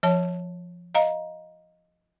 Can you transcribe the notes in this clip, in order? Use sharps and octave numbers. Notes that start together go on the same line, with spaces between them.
F3 C#5 A5
D#5 F5 A#5